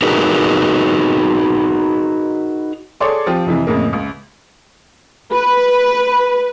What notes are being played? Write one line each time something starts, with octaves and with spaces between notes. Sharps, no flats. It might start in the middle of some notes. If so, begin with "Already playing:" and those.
D#4 F#4 G#4 A#4 B4
G#4 A4 C#5 D5 C6 D6
F3 C4 F4 G4
F2 C3 E3
F2 A2 C#3 A#3
C#2
B4